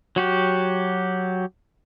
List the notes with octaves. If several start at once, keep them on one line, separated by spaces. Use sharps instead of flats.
F#3 F#4 G4